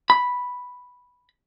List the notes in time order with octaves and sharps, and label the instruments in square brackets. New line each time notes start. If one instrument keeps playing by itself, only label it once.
[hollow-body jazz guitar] B5